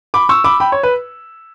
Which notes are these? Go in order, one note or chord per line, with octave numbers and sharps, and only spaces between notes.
B5 D6
C#6 E6
B5 D6
G5 B5
C#5
B4